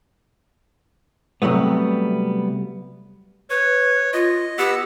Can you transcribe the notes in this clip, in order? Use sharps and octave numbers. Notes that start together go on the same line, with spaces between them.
C3 F#3 G3 A3 B3
B4 C#5
F4 D#5
B3 G4 F#5 E6